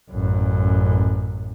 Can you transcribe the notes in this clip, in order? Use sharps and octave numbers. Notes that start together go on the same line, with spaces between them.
A1 F#2